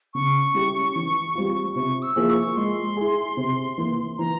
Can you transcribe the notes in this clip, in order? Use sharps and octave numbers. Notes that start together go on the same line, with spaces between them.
C#3 C#6
G3 C#4 E4 G4
E3
G3 C4 F4
C3 C#6
E6
F3 A#3 E4 G#4
C#6
G#3 C6
E4 G#4
C3
E3 A#3
E3 A#5